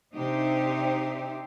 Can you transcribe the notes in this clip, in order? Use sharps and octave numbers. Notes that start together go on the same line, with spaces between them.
C3 D4 D#4 G4 C5 E5